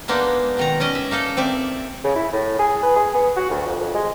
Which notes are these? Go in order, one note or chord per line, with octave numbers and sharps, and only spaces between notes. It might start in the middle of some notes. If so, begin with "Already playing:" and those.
G#3 A#3 B3 D4 D#4
B2 D#3 A#5
C#4 D5 D#5
E5
A#3 D#4 A4
C4 D5 E5
C#3
E4
A2
G#4
B4
G#4
B3
F#4
D2
F2
F2
G#3